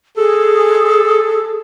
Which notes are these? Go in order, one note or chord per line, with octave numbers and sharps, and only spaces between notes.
G#4 A4